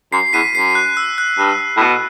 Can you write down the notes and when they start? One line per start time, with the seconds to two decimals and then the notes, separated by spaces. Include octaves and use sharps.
0.12 F#2 C7
0.33 E2 B6 D#7
0.54 F#2 C7
0.75 F#6
0.97 E6
1.18 F#6
1.38 G2
1.77 A2
1.80 B2